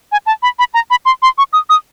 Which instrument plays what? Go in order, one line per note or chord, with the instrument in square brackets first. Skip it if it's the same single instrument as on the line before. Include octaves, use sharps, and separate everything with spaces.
[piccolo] G#5
A5
B5
B5
A#5
B5
C6
C6
C#6
D#6
D#6